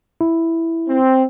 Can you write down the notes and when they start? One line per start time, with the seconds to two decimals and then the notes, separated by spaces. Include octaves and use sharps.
0.21 E4
0.89 C4